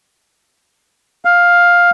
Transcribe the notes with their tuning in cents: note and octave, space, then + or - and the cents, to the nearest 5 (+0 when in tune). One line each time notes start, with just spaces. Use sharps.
F5 +10